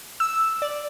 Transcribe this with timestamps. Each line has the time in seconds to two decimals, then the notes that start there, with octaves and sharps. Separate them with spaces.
0.20 E6
0.62 D5